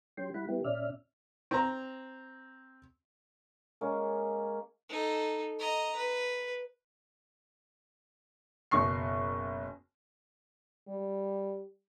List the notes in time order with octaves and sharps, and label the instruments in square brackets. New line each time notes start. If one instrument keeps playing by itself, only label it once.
[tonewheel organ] F#3 C#4 G4 G5 C6
G3 E4 F#5 B5
G3 B3 E4 G4
A#2 C#4 D5 E5 F6
[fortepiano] C4 A#5
[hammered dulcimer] G#3 A#3 C#4
[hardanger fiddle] D#4 A4
D#5 A#5
B4
[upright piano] F#1 B2 C#6 C7
[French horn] G3